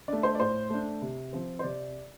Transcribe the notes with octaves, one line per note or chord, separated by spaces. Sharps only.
A3 D4 D5
C5
D5
A2 C5
A3 D4
C3
F3 C4
C5
C3 D5